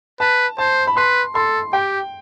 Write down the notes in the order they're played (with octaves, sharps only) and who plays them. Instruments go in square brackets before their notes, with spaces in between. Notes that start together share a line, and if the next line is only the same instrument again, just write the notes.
[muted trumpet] B4 [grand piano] A5
[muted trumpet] C5 [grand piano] A5
[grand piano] B5
[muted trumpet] B4 [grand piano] C6
[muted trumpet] A4 [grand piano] C6
[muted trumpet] G4 [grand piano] G5